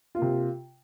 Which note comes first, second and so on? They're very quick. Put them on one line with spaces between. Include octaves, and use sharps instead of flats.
F4 A#3 C3